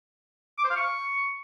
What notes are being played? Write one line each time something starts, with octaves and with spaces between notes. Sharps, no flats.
D6
C5
F5
C#6